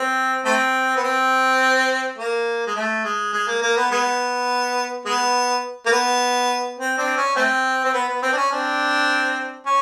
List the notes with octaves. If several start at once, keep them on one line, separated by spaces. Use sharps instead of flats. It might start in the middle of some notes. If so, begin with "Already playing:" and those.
Already playing: C4
A3 C4
B3
C4
A#3
G#3
A3
G#3
G#3
A#3
A#3
B3
G#3 B3
G#3 B3
A#3
B3
C4
C4 D4
C#4
A3 C4
C4
B3
B3
C4
D4
C#4
C4 D4
C#4